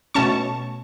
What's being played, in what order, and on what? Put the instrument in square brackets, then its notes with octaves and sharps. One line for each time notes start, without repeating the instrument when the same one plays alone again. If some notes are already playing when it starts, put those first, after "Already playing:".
[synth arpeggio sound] B2 A3 C#4 A5 C#6